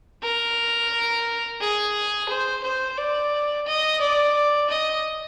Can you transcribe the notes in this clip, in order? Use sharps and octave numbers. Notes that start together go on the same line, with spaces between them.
A#4
G#4
C5
C5
D5
D#5
D5
D#5